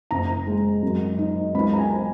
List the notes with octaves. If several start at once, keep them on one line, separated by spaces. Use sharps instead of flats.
F#1 A#5
G#3
F#2
D#4
C#2 B5
A#5
G#5